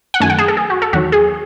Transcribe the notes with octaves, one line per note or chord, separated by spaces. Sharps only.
F#5
F#2 D#3 A3 G#5
F#5
G#4
A4
G#4
F#4
A4
E2 D#3 F#3 F#4
G#4